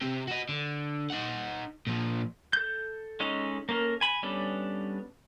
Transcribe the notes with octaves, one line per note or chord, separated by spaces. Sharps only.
C3 G4
F#4 D#5
D3
D#4 F#5
A#2 F3
A4 G6
G#3 C#4 D#4 A4
A#3 C#4 A4 A#4
G#5 B5
G3 B3 C#4 D4 A4